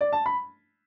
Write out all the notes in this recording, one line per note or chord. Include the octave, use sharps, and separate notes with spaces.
D5
A5
B5